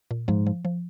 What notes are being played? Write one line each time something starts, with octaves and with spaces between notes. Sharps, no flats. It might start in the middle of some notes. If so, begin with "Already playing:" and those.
A#2
G#2 F3
F3
F3